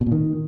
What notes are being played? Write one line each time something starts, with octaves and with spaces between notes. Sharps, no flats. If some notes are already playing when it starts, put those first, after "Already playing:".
B2
A#2
D#3